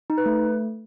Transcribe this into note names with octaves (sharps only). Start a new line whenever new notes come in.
D#4
B4
A3